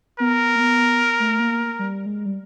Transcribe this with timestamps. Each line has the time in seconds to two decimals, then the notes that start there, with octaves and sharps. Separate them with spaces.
0.19 B3 A#4
0.56 A#3
0.60 B3
1.20 A3
1.40 A#3
1.79 G3
2.06 G#3
2.26 G3